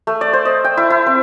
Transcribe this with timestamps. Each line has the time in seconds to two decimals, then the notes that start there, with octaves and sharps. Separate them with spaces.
0.07 A3
0.21 D5
0.33 C5
0.45 D#5
0.64 G5
0.77 E4
0.90 E4
1.06 C4